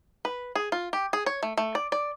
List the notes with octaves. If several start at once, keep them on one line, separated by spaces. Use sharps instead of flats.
B4
G#4
F4
G4
G#4
C#5
A3
A3
D5
D5